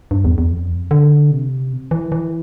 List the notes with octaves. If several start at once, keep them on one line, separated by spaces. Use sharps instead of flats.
G2
E2
E2
F2
D3
C3
E3
E3